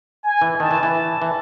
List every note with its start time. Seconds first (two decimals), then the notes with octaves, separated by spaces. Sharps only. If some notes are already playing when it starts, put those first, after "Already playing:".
0.24 G#5
0.41 E3
0.59 D#3 A5
0.71 E3
0.83 E3
1.22 E3